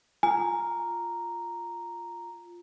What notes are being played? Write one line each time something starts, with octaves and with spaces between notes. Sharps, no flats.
F4 G#5 A#5